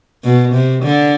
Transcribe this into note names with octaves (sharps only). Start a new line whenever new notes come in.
B2
C3
D3